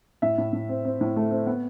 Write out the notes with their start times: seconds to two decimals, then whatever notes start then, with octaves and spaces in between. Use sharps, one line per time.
0.22 A2 E5
0.38 A2
0.53 A2
0.69 C4
0.85 C4
1.01 A2
1.16 A3
1.31 C4
1.47 B3